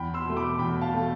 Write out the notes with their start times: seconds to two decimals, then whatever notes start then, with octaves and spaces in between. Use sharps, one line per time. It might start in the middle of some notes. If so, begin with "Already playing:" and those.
Already playing: E2 G5 B5
0.14 C6 E6
0.25 B2 A3
0.37 B5 D6
0.59 E2 G5 B5
0.81 F5 A5
0.93 B2 A3